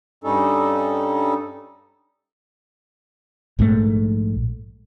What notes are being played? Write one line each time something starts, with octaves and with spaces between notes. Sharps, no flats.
G2 G3 C#4 D#4 A4
A#1 G#2 B2 A3